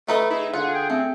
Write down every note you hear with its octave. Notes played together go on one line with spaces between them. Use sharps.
D#3 A3 B4 D#5
D#4 E4 G#4
D3 F4 G#4 F#5
G5
A3 C4